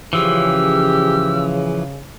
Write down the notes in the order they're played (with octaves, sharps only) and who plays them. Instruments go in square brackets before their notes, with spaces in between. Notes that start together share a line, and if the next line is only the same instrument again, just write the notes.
[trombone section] C#3 [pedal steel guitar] E3 F3 [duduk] G4 [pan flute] E6